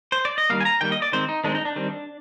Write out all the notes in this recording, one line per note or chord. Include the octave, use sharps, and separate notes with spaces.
C5
D5
D#5
D#3 G3 A#3 F5
G#5
A#5
D#3 G3 A#3 G5
D#5
D5
D#3 G#3 C4 C5
D#4
D#3 G#3 C4 D4
D#4
D4
D#3 G3 C4